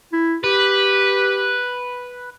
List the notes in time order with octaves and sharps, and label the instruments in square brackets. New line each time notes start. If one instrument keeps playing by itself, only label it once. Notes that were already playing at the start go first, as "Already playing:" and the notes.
[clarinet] E4
[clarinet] G4 [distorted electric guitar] B4